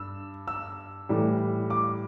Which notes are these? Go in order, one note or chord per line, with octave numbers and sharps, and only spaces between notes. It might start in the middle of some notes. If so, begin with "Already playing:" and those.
Already playing: G2 E6
E6
A2 E3 G3
D6